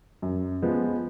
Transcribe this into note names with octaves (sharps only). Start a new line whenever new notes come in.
F#2
F3 G#3 B3